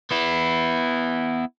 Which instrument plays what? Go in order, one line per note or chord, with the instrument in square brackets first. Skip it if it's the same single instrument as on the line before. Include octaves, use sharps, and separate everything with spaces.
[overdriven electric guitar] B3 E4